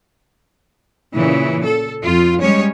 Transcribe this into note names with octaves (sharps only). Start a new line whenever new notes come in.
A#2 C#3 E3
A4
F2 F4
G3 G#3 C#4 C#5